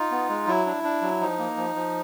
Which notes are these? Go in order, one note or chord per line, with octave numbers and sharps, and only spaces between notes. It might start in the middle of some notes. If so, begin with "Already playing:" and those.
Already playing: D#4 F4
B3
G#3
F#3 E4
D4
D4
F#3
F3 D#4
A#3
F3
F3